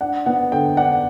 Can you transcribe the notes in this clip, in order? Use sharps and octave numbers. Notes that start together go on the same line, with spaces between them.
D4 F#5
B3 F#5
D3 G5
D4 F#5